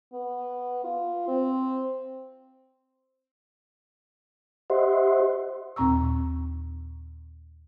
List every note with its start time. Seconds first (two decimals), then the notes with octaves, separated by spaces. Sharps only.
0.13 B3
0.84 F4
1.28 C4
4.70 G4 C5 D#5 E5 F#5 C6
5.76 D#2 A#2 C4 A#5 C#6 E6